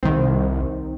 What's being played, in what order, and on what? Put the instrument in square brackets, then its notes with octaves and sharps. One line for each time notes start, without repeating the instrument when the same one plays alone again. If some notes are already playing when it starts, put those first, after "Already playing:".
[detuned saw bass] C2 [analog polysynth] D#3 C4